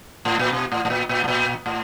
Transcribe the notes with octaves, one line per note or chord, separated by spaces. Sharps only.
A2
A#2
B2
A2
A2
A#2
A#2
A2
A#2
A2